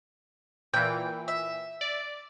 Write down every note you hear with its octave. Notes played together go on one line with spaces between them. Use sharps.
A#2 E3 G5
E5
D5